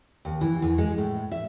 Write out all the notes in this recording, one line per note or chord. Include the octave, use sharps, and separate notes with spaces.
D#2
E3
E2
G#3
A2
E5